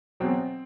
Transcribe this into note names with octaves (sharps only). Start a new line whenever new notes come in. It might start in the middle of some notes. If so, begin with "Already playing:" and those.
E2 B2 F#3 C4